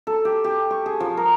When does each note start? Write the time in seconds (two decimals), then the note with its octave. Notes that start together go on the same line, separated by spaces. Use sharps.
0.07 A4
0.25 G4
0.44 G4
0.71 C#6
0.86 G#4
1.00 F3
1.17 A#4